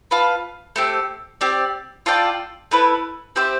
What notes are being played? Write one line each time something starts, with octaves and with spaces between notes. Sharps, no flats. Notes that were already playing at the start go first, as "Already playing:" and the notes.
F4 B4 F5 A5
A3 C4 G4
C4 G4 D5
F4 A4 D5 G5
A3 E4 B4
C4 G4 C5 E5